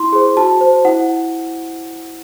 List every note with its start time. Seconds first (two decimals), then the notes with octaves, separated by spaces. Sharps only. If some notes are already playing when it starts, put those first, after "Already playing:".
Already playing: E4 C6
0.13 G#4 C5
0.37 F#4 A5
0.61 C5
0.85 E4 F#5